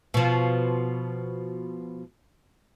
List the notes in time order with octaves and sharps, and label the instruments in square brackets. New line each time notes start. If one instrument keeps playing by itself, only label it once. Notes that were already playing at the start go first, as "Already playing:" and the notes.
[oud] B2 F3